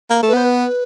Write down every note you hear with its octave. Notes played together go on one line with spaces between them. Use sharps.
A#3
A3
B4
B3 C5
B4